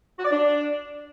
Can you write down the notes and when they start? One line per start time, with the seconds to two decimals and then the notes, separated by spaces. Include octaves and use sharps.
0.19 F#4
0.25 D5
0.31 D4